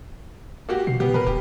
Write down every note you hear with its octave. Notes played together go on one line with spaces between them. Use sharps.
A#3 F#4 G4
B2 C7
B2 B3 G4
A#2 A#4 B4
D1 G4